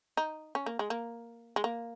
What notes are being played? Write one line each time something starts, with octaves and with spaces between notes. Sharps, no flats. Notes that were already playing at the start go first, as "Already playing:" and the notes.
D#4
C#4
A#3
G#3
A#3
G#3
A#3